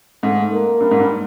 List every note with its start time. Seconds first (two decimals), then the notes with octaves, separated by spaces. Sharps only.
0.23 G#2 A3
0.52 A#3
0.80 G2
0.91 G#2
1.00 G2